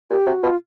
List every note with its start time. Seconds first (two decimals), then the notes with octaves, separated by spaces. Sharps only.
0.10 A#2 G4
0.26 C3 F#4
0.43 B2 F4